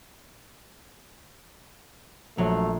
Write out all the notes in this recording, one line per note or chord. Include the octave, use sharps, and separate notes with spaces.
A#1 F#3 A3 C7